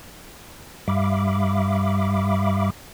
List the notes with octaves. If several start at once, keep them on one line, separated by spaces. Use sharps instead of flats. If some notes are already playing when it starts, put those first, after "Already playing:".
G2 G3 E5 F5 B5 D6